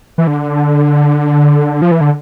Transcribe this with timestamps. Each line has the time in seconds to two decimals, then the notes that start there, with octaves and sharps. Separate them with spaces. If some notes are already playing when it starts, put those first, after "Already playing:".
0.18 E3
0.27 D3
1.82 F3
1.91 E3
2.01 D3